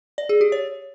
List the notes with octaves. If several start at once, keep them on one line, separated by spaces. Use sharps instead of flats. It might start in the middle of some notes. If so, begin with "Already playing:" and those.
D5
G#4
G4
C#5